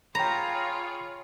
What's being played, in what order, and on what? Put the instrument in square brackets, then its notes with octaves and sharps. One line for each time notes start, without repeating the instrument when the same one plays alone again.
[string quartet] F4 G#4 C#5 [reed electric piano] G5 B5 [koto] A#5